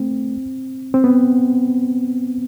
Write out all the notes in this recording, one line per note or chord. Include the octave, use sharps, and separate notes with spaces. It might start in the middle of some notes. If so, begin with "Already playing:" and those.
Already playing: A3 C4
C4
B3